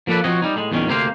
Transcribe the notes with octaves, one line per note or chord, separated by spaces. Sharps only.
F3 A#3 D4 A4 B4
F3 C4 F#4 C#5 D#5
G3 D#4
A2 G#3
E2 A#2 D#3 C#4
D2 C3 A#3 C5 F5